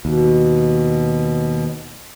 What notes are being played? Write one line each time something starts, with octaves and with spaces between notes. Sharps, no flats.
D#2 B2